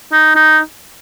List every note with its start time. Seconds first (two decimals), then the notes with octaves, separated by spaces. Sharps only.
0.12 D#4
0.35 D#4